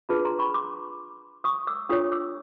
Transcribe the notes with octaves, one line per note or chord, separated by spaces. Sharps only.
D4 F4 G#4 B4 A5 B5
A#5 C6
B5 C#6
C6 D6
C#6 D#6
D6 E6
D4 F4 A4 C#5 C#6 D#6
D6 E6